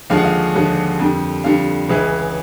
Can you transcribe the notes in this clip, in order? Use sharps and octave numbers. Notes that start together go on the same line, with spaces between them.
D#2 D3 F3 G#3 F5
F#5
F5
D#2 D3 F3 G#3
F2 D3 G3
F2 D3 G3 F5
C#2 C#3 E3 G#3